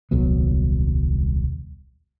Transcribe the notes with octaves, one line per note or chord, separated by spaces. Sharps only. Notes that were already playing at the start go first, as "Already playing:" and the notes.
D#1 C2 F#3 B3